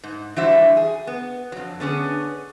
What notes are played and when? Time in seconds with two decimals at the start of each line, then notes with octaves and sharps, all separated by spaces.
0.04 G#2
0.36 E3 G3 D4 F#4 C5 E5
0.77 G#4
1.07 B3
1.52 F2 F#3
1.80 D3 B3 C#4 G#4